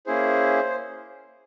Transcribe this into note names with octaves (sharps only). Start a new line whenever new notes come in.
A#3 C#4 E4 G#4 C5